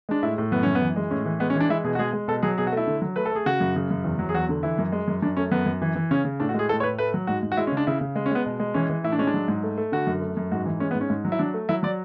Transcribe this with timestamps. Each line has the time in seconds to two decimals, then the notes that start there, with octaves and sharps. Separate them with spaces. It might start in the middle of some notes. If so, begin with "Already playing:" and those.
0.09 G#3 D4
0.23 A2 E4
0.38 A2
0.52 F#2 B3
0.63 F#2 C#4
0.75 B3
0.81 E3
0.96 G#3
1.10 A2 C#4
1.26 E3
1.40 G#3 B3
1.50 C#4
1.56 E3 D4
1.69 G#3 E4
1.84 B2 G#4
1.95 F#4
1.99 G#3 G#4
2.13 G#3
2.28 B2 A4
2.43 F#3 G#4
2.58 B2 G#4
2.67 F#4
2.72 A3 E4
2.87 D3
3.02 F#3
3.16 A3 B4
3.26 A4
3.32 A3 G#4
3.46 C#3 F#4
3.60 F#2
3.76 C#3
3.91 F#2
4.04 E2
4.19 F#3
4.29 G#4
4.35 E2 F#4
4.49 D3
4.63 E3 E4
4.78 F#2
4.92 G#3
5.08 F#2
5.22 F#2 D4
5.37 A3 C#4
5.51 F#2 B3
5.66 F#2
5.82 E3
5.96 E3
6.11 C#3 C#4
6.25 C#3
6.40 A2 D4
6.49 F#4
6.54 G#3 G#4
6.69 A2 A4
6.80 C#5
6.83 A2 B4
6.99 A3 B4
7.14 F#3
7.27 G#2 F#4
7.43 G#2
7.52 F#4
7.57 G#3 E4
7.67 C#4
7.72 C#3
7.77 D4
7.87 C#3 E4
8.01 C#3
8.16 G#3
8.26 C#4
8.31 G#3 B3
8.46 B2
8.60 G#3
8.74 E3 C#4
8.90 E3
9.04 A2 E4
9.12 D4
9.19 G#3 C#4
9.27 D4
9.34 F#3
9.48 G#2
9.63 A3
9.78 A3
9.92 D3 F#4
10.07 F#2
10.21 A3
10.37 F#2
10.52 G#2 F#4
10.66 E3
10.80 G#3 C#4
10.91 B3
10.95 G#2
11.01 C#4
11.10 G#2
11.25 F#3
11.32 E4
11.39 F#3 D4
11.54 A3
11.69 F#3 E4
11.83 F#3 D5